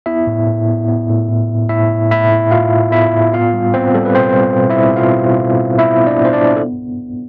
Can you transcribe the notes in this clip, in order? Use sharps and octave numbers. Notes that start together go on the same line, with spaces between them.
B3 E4 E5
A2
A2
B3
B3
A2
A2
A2
A2 E4 E5
A2
A2 E4 E5
A2
A2 F4 F5
A2
B3 E4 E5
A2
B3 F4 F5
G3
B3 C4 C5
G3 A4
B4
B2 C4 C5
G3
B2
E4 E5
G3
B2 F4 F5
B2
B2
B2
B3 E4 E5
B3
D4 D5
B3 C5
D4 D5
B3
A4